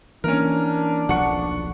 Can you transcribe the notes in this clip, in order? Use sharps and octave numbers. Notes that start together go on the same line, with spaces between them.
E3 A#3 C#4 D4 A#4
D#1 B1 F3 F#5 C#6 C#7